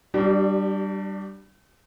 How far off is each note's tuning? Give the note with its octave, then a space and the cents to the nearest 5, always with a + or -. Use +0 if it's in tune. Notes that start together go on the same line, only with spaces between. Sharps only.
G3 -10 D4 +25 G4 -45